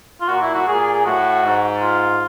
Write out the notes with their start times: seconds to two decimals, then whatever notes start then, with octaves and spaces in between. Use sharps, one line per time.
0.21 F4
0.29 A#2 F#4
0.42 E4
0.55 F#4
0.67 A#2 G#4
0.80 G#4
0.93 G#4
1.05 A2 F#4
1.43 G#2
1.82 F4